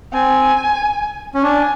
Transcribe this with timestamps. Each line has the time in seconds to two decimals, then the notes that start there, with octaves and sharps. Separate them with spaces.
0.13 C4 G#5
1.35 C#4
1.43 D4 G#5